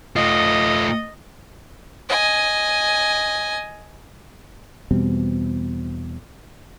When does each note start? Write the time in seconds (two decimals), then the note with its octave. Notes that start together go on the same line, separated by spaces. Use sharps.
0.16 A3 F4 D#5
2.09 D#5 G#5
4.91 E2 B2 G3 C4